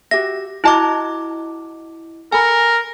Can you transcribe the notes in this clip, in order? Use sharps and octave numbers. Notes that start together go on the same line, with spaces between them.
F#4 G4 E5 A#6
E4 F#4 D#5 A5 A#5 D6
A4 A#4 G#5 B5